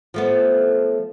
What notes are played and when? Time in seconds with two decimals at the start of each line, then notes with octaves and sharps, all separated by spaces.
0.14 F3 A3 B3